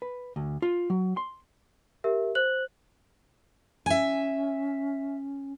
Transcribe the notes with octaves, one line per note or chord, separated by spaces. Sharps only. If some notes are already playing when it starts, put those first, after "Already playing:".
B4
D2
F4
F#3
C6
G4 A#4 E5
C5 F#6 F#7
C#4 E5 G#5